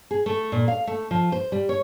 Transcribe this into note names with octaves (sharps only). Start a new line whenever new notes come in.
G#4
A3
A#2
F5
A3
F3
C5
G3
C#5